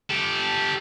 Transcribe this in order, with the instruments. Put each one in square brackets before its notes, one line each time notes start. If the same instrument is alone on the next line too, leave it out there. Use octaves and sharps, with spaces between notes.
[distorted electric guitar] G4 A4